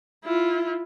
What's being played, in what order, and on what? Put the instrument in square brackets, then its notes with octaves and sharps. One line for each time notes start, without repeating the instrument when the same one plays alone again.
[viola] E4 F4